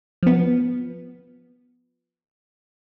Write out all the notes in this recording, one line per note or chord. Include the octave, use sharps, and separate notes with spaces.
F3 B3